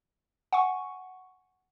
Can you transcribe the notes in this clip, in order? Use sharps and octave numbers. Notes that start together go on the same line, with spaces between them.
F#5 G#5 C#6